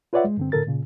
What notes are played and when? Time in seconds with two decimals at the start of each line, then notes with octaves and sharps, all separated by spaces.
0.13 F4 B4 C#5 D5 E5 F#5
0.24 G#3
0.37 G2 D3 C4
0.52 A2 D3 A4 A#4 A6
0.67 A#2 C#3